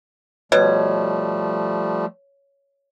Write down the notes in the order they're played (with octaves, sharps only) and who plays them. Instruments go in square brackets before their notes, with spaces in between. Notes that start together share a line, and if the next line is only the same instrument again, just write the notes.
[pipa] B2 [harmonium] F3 G3 A3 [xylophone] C#5